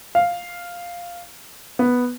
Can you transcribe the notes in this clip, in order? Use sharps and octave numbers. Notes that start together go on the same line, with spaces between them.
F5
B3